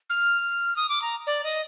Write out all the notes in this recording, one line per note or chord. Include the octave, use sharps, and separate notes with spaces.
F6
D#6
D6
A#5
D5
D#5